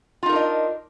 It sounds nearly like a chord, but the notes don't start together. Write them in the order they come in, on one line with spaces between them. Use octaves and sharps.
F4 D#4 A#4 D4 D#5